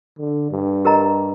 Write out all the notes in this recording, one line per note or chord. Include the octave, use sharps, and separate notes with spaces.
D3
G2
G4 A#4 D#5 A#5